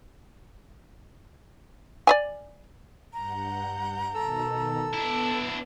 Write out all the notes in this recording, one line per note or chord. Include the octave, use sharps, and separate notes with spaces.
D5 E5 G#5
G2 F#5 A#5 G6
B2 D#3 A4 E6
B3 D4 E4